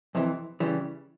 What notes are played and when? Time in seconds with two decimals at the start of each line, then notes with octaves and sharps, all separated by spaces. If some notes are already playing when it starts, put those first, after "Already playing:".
0.15 F2 C3 E3
0.60 C#3 E3 G3